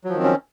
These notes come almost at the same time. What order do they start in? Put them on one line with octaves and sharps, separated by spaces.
F#3 F3 D#3 C4 C#4